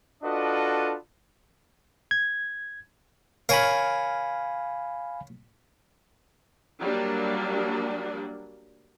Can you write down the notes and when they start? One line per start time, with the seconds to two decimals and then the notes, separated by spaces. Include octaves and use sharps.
0.23 D4 F4 F#4 A4 B4 D#5
2.11 G#6
3.49 A#4 C#5 F5 G#5 B5
6.80 F#3 G3 A#3 D4